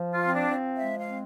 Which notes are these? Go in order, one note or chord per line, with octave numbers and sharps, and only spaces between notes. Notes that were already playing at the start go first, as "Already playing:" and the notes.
Already playing: F3
F4
C4
D4
F3
G#3 E5
F5
C4